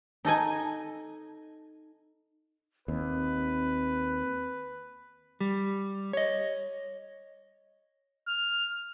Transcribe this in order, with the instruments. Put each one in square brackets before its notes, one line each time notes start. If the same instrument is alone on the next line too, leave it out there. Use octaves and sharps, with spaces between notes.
[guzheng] D#4 A4 D#5 G#5
[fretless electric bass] D#2 [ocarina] C4 [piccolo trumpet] B4
[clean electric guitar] G3
C#5 D#5
[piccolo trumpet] F6